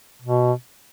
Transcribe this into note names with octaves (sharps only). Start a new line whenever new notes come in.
B2